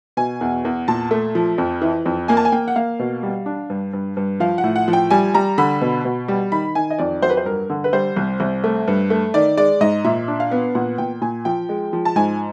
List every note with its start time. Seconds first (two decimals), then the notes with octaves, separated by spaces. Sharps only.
0.17 B2 G#5
0.41 E2
0.65 E2
0.88 A#2 A5
1.11 A3
1.35 F3
1.58 F2
1.82 E3
2.06 F2
2.28 A#3 G#5
2.37 A5
2.45 G#5
2.52 A#3 G5
2.68 F#5
2.76 A#3 F5
2.99 B2
3.23 G3
3.46 D4
3.70 G2
3.93 G2
4.17 G2
4.40 F3 F5
4.58 F#5
4.64 A2
4.76 F#5
4.88 F3
4.93 G5
5.10 G3 G#5
5.34 G3 A#5
5.58 D3 B5
5.81 B2
6.05 B2
6.28 G3
6.52 D#3 B5
6.75 D#3 G#5
6.90 D#5
6.99 F2 D5
7.22 F#3 C5
7.30 B4
7.37 C5
7.45 G2 A#4
7.70 D3
7.84 B4
7.93 G3 C5
8.17 C2
8.40 C2
8.64 A3
8.88 G2
9.10 A3
9.34 D#3 D5
9.57 G#3 D5
9.81 G#2 D#5
10.04 A#2 E5
10.28 D4
10.40 F5
10.51 B3
10.75 A#2 F#5
10.98 A#2 G5
11.21 A#2 G#5
11.45 F3 G5
11.69 G#3
11.93 F3
12.05 A5
12.16 G#2 G#5